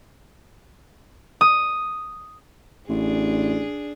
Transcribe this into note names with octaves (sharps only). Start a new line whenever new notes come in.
D#6
A1 D4 G#4